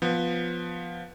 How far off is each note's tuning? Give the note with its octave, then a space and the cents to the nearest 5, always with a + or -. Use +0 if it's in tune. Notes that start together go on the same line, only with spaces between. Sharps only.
F3 +0 B3 +0